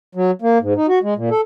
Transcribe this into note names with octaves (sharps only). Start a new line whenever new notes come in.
F#3
A#3
G#2
D#4
F#4
G#3
A#2
A4